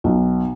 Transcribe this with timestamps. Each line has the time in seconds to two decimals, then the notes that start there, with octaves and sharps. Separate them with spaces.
0.04 B1